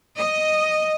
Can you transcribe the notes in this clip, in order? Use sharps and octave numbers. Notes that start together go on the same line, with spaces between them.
D#5